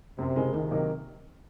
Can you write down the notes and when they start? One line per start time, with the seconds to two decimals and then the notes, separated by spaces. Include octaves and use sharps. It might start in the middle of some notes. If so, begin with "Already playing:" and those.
0.18 F#2 C3
0.35 C#3 G#3 D#4 A#4
0.53 C#2 D#3
0.71 C3 F#3 A#3 D#4